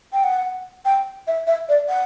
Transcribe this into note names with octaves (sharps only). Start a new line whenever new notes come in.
G5
F#5
G5
E5
E5
D5
F#5